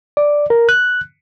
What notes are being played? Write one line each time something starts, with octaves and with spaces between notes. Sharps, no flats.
D5
A#4
F#6